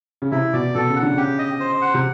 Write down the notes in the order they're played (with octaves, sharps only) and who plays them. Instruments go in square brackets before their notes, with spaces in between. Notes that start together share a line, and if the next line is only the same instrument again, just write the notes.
[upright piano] C#3
[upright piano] C3 [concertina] E4
[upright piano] B2 [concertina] D5
[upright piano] B2 [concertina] A4
[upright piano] C#3
[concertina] F#5
[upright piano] D3
[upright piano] C#3 [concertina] G4
[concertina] D#5
C5
F#5
[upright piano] C3